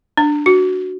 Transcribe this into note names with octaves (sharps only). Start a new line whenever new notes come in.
D4
F#4